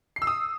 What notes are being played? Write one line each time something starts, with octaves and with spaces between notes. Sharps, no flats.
C7
E6
D#6